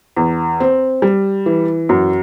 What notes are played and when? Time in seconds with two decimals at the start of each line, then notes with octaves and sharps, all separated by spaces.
0.17 E2
0.60 C4
1.02 G3
1.46 E3
1.89 F#2